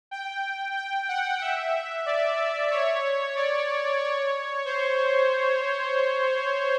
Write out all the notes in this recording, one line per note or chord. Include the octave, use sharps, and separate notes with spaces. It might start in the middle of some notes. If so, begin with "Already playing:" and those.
G5
G5
F#5
E5
D5
C#5
D5
C#5
C5